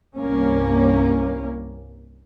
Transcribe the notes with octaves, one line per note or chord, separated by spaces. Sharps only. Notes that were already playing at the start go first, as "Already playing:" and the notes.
C2 G2 A#3 C#4